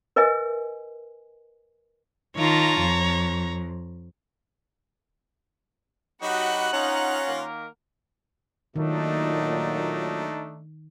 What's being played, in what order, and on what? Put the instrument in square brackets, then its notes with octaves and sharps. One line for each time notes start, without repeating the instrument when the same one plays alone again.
[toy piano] A#4 B4 D#5 E5 G#5
[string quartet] D#3 F4 A5 [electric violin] C#5 A#5
[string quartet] F2
[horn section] F#3 D#4 D#5 [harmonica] F#4 G4 B5 [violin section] F#5 F#6
[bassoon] C#4 [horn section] D#4 [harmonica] F4 A#5
[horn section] D#3 A#3 A#4
[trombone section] A#2 F#3 [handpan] D#3 [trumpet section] A3 D4 D#4